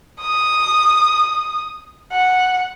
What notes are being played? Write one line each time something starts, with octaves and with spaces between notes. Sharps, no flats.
D#6
F#5